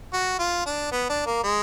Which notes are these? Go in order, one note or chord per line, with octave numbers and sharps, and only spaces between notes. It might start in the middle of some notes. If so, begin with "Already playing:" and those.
F#4
F4
D4
B3
D4
A#3
G#3